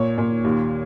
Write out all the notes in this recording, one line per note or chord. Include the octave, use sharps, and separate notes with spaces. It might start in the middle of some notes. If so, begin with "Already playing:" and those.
Already playing: A#2 C#5
A#2
D#2